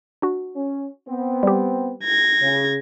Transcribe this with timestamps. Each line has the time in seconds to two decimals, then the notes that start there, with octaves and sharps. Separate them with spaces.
0.22 D4 F#4
0.55 C#4
1.07 B3 C4
1.43 G3 G4
2.04 G#6 A#6
2.41 C#3